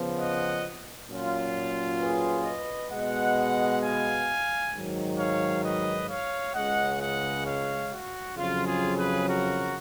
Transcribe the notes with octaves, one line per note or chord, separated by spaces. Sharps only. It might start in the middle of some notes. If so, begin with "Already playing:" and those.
Already playing: C#3 F3 B3
D#5 F#5
A#2 F#3 C#4 F4
G#4 B4
B4 D#5
B2 G#3 B3 D#5 F#5
F5 G#5
G#2 D#3 F#3
C#5 F5
B4 D#5
C#5 F5
C#2 C#3 G#3 D#5 F#5
D#5 F#5
C#5 F5
F#4
F2 C#3 F#3 C#4 F4
F4 G#4
G#4 B4
F#4 A#4